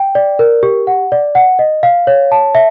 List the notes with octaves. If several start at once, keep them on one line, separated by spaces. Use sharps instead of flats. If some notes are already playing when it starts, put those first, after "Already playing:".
Already playing: G5
D5
A#4
G4
F#5
D5
F#5
D#5
F5
C#5
A5
E5